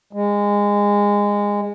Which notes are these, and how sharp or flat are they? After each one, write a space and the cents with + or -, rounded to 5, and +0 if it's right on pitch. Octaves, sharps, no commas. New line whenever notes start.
G#3 -20